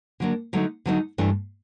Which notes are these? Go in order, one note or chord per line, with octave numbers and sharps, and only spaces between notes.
D3 F#3 A#3 D4
D3 F#3 A3 C4 D#4
D3 F#3 A3 C4 D#4
G2 E3 A3 D4